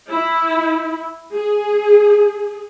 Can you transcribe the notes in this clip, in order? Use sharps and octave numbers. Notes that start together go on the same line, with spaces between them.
E4
G#4